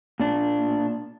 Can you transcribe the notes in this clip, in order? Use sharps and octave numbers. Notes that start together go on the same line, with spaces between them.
A#2 D4